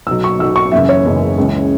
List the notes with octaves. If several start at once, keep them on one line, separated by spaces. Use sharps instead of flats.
B1 B2 F#3 E6
C#6
B1 B2 F#3 E6
C#6
F#1 F#2 C#3 E3 E5
C#5
F#1 F#2 C#3 E3
C#2 C#3 E3